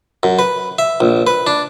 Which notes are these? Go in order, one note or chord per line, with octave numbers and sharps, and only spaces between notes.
F#2
B4
E5
A#1
B4
D4